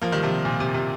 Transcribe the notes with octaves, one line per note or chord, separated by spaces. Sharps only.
F3 A#3
D#3 G3
C3 F3
A#2
C3
C3